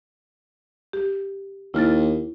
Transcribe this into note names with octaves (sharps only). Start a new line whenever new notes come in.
G4
D#2 E4 F6 A6